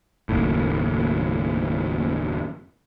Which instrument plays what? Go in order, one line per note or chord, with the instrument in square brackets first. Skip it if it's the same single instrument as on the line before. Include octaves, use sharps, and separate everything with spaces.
[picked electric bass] F#1 D#2 A2